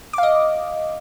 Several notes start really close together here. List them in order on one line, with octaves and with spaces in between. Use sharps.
D6 F5 D#5